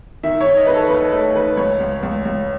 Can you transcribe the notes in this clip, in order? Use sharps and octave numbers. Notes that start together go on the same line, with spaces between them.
D#3 E5
C#5
D#3
D#5
D#3 B4
A4
D#2 B4
A3 A4
D#3 B4
C#2 C#5
C#2
C#2
C#2